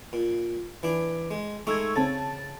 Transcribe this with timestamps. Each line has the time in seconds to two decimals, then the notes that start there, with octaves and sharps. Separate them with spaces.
0.13 A#2
0.83 E3 D4
1.31 G#3
1.67 G#3 A3 D#4 C#6 E6 G#6
1.96 C#3 C4 A5 A6